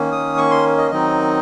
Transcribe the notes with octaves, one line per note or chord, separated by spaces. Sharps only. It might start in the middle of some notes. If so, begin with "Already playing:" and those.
Already playing: D#3 A#3 C#4
D#6
C#6
C6
D#5
D#3 F#3 C4 D#4 D#5